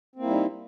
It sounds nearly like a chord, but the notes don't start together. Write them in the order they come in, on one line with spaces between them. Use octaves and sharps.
C4 A#3 E4 G3 D#4